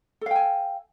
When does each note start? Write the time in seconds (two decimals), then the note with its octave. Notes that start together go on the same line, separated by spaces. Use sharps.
0.21 A4
0.26 F5
0.31 G5
0.36 G#5